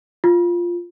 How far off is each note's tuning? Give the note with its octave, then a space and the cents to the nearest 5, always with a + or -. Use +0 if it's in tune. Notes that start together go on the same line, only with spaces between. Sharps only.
F4 +0